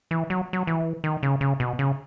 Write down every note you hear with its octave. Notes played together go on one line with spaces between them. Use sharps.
E3
F#3
F#3
E3
D#3
C#3
C#3
B2
C#3